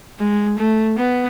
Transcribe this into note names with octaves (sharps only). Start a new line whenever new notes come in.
G#3
A3
B3